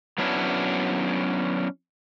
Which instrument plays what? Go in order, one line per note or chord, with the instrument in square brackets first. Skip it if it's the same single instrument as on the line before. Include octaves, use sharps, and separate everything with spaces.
[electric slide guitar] F#3 B3 C#4 D4 E4